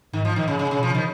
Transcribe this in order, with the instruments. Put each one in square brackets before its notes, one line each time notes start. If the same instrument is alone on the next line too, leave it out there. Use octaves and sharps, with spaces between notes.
[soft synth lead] G#2 [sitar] D#3
[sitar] F3
[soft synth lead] A#2 [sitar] D#3
[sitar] C#3
[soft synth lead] A#2 [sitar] C#3
[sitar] C#3
[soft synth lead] B2
[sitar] F3
[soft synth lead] C#3
[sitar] D#3